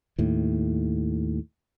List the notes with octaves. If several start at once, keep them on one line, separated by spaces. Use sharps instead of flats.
D#2 A2